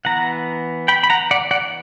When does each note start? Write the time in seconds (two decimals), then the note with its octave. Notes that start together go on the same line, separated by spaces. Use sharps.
0.05 E3 B3 F#5 A#5
0.88 G5 B5
1.03 B5
1.10 F#5 A#5
1.31 D5 F#5
1.51 D5 F#5